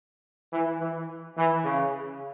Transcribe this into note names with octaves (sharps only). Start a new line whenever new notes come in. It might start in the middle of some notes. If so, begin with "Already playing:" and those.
E3
E3
E3
C#3